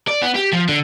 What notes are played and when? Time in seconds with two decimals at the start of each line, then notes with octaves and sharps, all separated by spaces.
0.07 D5
0.22 B3
0.35 G4
0.53 F3
0.69 D3